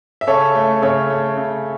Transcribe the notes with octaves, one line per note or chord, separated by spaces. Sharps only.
E5
C#3 A4 C#5
A3
C#3 A4 C#5
A3
C#3